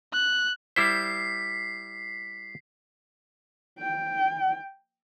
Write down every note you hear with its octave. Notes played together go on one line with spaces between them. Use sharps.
F#6
G3 E4 C5 B6 C7
G5